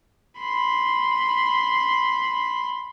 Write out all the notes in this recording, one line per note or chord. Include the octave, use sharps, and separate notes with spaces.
B5 C6